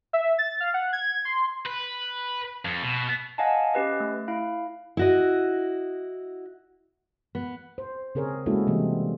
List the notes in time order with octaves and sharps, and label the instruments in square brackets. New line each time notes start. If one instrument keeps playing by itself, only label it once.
[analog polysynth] E5
A6
F5
F#5
G#6
C6
[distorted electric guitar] B4
F2
B2
[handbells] D#5 F5 F#5 G#5 A5
C#4 G4 B4 D#5
A3
E4 F5
[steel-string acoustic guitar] E4 F#4 D#5
B3
[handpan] C5
C#3 C4 G#4 A#4 C#5
G#3 A#3 C#4 E4 F#4 A4
C3 E3 G3 A#3 C4